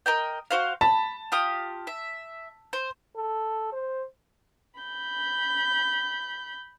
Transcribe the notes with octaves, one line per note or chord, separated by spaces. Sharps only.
A#4 D#5 G5
F#4 C5 F5
A5 B5
F4 G4 D#6
E5
C5
A4
C5
B5 G6